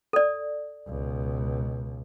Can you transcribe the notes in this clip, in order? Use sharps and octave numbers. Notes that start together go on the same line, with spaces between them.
A4 D5
C#2 B2